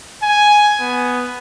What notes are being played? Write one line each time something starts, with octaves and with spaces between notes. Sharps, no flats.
G#5
B3